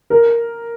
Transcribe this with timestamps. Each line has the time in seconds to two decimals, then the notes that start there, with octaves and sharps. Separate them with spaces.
0.10 A#4